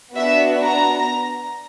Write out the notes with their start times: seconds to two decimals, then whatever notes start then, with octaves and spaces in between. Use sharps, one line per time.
0.16 B3 D4 F#4 E5
0.63 A#5